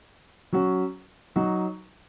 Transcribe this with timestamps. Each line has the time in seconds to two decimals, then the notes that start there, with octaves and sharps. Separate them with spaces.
0.53 F#3 C#4 F#4
1.36 F#3 D#4 F#4